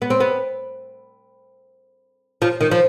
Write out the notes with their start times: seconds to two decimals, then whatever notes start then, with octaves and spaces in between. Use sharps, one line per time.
0.02 B3
0.10 C4
0.20 B3
2.42 F3
2.61 D#3
2.71 F3